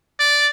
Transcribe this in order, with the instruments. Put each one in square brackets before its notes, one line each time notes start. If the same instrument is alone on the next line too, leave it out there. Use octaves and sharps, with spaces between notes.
[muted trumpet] D5